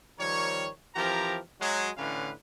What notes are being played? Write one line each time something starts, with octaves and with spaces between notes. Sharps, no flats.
D#3 F3 G3 A#4 C#5
E3 F3 C4 G4 A#4 A#5
F#3 G#3
A2 D3 E3 C#4 B4 F5